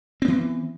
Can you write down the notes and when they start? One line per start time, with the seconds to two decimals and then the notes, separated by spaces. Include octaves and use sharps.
0.22 C4
0.25 B3
0.28 E3